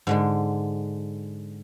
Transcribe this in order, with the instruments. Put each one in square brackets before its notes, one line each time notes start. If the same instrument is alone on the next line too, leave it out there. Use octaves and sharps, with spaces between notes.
[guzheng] G#2 D3 G#3